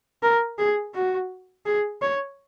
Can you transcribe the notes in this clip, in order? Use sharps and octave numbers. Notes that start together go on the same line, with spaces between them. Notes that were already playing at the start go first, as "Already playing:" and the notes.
A#4
G#4
F#4
G#4
C#5